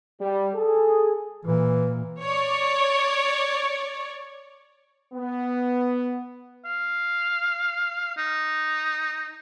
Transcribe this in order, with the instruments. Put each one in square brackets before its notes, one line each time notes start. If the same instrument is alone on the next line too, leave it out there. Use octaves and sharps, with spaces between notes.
[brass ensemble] G3
G#4 A4
[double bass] A#2 [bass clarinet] E3
[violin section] C#5 D5
[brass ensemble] B3
[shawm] F5
D#4